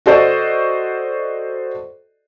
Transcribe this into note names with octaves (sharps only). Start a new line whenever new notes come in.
F#4 A4 C5 D5 D#5